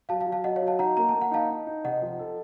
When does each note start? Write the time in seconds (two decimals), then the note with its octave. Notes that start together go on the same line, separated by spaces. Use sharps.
0.09 F#3 F5 A5
0.20 F5 A5
0.26 F#3
0.32 F5 A5
0.44 F#3 D#5 F#5
0.56 C#5 F5
0.62 F#3
0.67 F5 A5
0.79 D#4 F#5 A#5
0.97 A#3 A#5
1.09 A5
1.14 A#3
1.21 F#5
1.31 D#4 F5 A5
1.50 D#4
1.67 D#4
1.84 C3 D#5 F#5
2.02 F3
2.19 A4